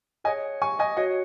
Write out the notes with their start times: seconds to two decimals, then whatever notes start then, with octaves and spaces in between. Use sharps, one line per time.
0.24 G#4 C#5 D#5 F#5 G#5
0.62 G#5 C#6
0.79 D#5 G#5
0.97 F#4 C#5 D#5 F#5